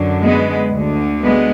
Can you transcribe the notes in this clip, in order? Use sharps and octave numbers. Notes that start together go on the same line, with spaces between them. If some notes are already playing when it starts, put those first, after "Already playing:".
Already playing: F#2 D3
G#3 B3
D2 D3
G#3 B3